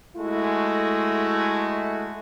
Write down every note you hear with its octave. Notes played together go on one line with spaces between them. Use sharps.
G#3 A3 E4 F#4